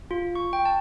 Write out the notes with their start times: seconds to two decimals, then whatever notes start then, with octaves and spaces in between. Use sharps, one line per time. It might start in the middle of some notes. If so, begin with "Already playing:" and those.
0.11 F4
0.35 C#6
0.53 G5
0.65 A5